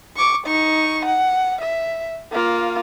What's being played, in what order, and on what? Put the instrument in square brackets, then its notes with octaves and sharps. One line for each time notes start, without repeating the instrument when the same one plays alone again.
[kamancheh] C#6 D6
D#4 C#6
F#5
E5
A#3 F4